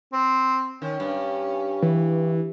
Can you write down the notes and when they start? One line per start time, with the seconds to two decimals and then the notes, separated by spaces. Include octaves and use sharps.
0.13 C4
0.82 D#3 C#4
1.00 G2
1.82 E3